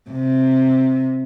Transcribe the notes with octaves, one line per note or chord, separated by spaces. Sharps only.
C3